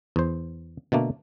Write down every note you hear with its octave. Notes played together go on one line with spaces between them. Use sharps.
E2 C5
B2 D3 A3 A#3